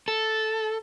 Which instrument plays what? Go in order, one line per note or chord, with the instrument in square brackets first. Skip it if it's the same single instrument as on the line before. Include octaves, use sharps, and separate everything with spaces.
[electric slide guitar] A4